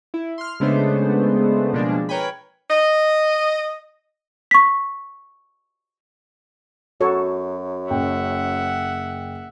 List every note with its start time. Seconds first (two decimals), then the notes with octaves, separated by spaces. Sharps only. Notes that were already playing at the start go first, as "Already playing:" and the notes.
0.14 E4
0.38 C6 F6
0.60 C#3 G#3 A3 B3 D4 C5
1.73 B2 F3 G3 G#3 A#3 D4
2.09 A#4 B4 C#5 G5 G#5 B5
2.71 D#5
4.51 C#6 B6
7.01 F#2 F#4 A4 C#5
7.90 F#1 E5 F#5 G5